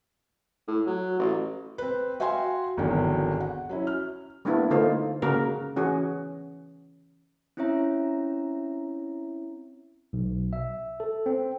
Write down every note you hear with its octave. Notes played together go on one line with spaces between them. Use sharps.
A2
F#3
A1
C4 B4
F#4 E5 F5 G5 G#5 C6
G#1 E2 G#2 D3 D#3 F#3
F#5
F#3 C#4 E4
F6
G3 A#3 B3 D4 E4
D3 A3 A#3 D#4 F4 C5
C#3 A#3 F#4 A#4
E3 C#4 F#4 G#4
C4 C#4 E4 C#5 E5 A#5
B1
E5
A4
C4